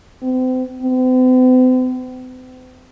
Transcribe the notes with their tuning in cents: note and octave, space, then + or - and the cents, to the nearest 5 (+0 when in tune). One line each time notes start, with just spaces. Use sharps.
C4 -35
C4 -45